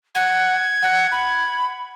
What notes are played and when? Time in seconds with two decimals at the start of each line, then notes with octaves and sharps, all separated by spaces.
0.15 F#5 G#6
0.82 F#5
1.11 B5